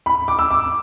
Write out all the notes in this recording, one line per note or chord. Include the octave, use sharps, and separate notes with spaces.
B5
D6
E6
D6